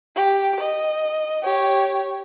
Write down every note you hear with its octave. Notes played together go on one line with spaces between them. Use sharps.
G4
D#5
G4 C#5